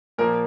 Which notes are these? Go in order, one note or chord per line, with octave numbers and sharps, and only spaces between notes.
A#2 F3 A#3 A#4